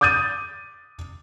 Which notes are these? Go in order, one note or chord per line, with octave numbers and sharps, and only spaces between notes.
D6 D#6 G6 A6 D#7